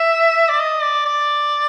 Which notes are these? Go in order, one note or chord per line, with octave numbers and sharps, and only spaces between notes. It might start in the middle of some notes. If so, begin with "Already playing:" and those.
Already playing: E5
D5
D#5
D5
D5